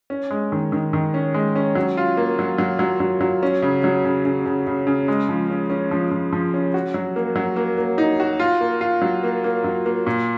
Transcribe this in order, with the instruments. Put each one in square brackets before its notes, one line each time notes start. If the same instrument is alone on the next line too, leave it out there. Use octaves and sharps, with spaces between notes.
[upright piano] C#4
G#3
D#3
D#3
D#3
C#4
G#3
C#4
F#3
F4
A#3
F#3
F#3
F#3
F#3
F#3
C#4
C#3
F#3
C#3
C#3
C#3
C#3
C#3
G#3
F3
C#4
C#4
F3
F3
F3
C#4
F#4
F#3
A#3
F#3
A#3
A#3
D#4
F#4
F4
A#3
F4
F#3
A#3
A#3
F#3
A#3
A#2